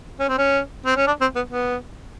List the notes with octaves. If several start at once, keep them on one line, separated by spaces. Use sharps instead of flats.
C#4
C4
C#4
C4
C#4
D4
C4
B3
B3